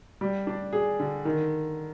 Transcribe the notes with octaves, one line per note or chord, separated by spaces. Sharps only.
G3
D4
G#4
D3
D#3